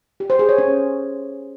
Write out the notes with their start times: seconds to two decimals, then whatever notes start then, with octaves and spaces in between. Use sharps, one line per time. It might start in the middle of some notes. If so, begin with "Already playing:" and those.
0.20 G4
0.30 C5
0.39 G#4
0.49 C#5
0.58 C#4